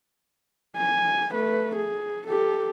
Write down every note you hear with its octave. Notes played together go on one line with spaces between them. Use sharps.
G#5
A3 B4
G#4
G4 A4